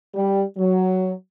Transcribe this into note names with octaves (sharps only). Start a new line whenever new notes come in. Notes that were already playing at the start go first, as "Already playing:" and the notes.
G3
F#3